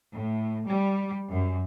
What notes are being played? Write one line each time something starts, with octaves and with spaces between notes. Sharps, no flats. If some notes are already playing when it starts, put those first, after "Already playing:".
A2
G3
F#2